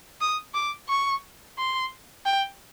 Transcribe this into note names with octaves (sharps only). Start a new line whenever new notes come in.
D#6
D6
C#6
C6
G5